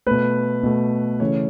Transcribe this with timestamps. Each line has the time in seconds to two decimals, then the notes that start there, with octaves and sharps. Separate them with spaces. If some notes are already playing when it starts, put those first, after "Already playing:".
0.07 B2 A3 B4
0.63 B2 A3
1.20 C#3 E3 A3 C#5